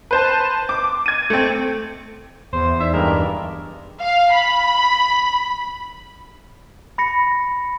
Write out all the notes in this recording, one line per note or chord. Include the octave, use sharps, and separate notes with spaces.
B4 C5 A5
D6
G#6 D#7
A3 C4
E2 C5
E5
D#4 D5 E5 B6
G2 G#3 A#4
D#5 C#6 D6
F5
B5
B5 A#6 C#7